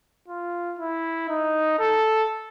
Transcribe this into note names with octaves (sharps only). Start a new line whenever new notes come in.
F4
E4
D#4
A4